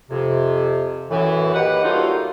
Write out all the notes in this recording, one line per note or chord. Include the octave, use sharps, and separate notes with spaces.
F2 C3
F#2 A2 E3
A#3 D#4 G4 B4 F#5
F#3 G3 A3 A#3 D#4 F4